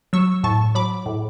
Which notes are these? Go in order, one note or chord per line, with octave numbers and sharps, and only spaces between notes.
F#3 C#6 E6
A2 A5 C#6
F#3 B5 D6
A2